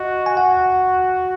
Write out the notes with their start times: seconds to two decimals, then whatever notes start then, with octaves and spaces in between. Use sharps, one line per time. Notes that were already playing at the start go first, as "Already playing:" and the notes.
Already playing: F#4 D#5
0.26 G#5
0.37 F#4 F#5